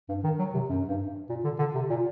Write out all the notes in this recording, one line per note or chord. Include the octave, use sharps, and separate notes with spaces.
G2
D#3
F#3
C3
F#2
G2
A#2
D3
D3
C3
A#2